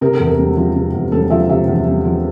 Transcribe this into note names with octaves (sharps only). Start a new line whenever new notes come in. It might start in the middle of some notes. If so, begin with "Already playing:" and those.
C3 A#4
A4
E2
A#4
E1
F3
C3
E2
E1 A4
F3 E5
C3 E5
E2
E1
F3